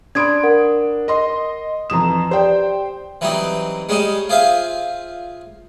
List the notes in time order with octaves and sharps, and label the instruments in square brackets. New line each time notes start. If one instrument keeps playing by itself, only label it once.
[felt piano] D4 D#6 D7 [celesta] B5 C6 G#6
[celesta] A#4 F#5
[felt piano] D#5 C6
[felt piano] F2 E3 E7 [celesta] A#5 D#6
[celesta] G4 D5 [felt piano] C5 G5
[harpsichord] E3 F#3 G3 C4 D#4
G3 G#3 C#4 D#4 G#4
F4 G#4 C5 E5 F5